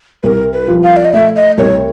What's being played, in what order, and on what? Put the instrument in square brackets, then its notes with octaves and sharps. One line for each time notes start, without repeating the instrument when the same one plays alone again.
[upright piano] C2 [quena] A#4 B4
[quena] B4
[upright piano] F3
[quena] F5
D5
D#5
[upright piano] A3 [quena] E5
[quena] D#5
[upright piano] C2 [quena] C#5